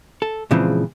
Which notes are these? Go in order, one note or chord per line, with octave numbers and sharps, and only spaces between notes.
A4
A#2 C#3 E3 F3 G#3 C4